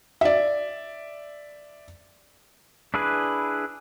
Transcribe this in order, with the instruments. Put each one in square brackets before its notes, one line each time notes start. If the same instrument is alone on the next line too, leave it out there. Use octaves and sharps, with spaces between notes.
[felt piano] D5 E5
[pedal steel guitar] D4 E4 G#4 B4